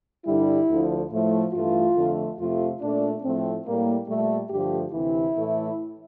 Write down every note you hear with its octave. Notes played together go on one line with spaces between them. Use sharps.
G2 D3 G3 E4
D2 D3 F3
A2 F3 A3
G2 E3 A3 F4
F2 D3 A3
F2 C3 F3 A3 F4
A#2 A3 D4
A2 F3 A3 C4
A2 G3 A#3
A#2 G3 A3
G2 D3 F3 A3 G4
D2 C3 E3 E4
A2 E3 A3